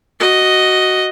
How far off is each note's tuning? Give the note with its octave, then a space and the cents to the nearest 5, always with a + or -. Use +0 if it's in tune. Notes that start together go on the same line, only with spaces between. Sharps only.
F#4 +5 D#5 +0